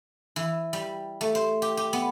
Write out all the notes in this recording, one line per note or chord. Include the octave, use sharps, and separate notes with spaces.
E3
G3
A3
C5
G4
G4
B3